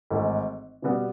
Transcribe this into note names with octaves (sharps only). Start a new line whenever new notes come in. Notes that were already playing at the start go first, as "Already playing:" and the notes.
G#1 G#2 E3 A3
B2 G3 B3